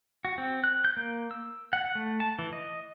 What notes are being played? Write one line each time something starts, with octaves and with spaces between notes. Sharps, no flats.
F#4
C4
F#6
G6
A#3
E6
F#5
A3
A5
E3
D#5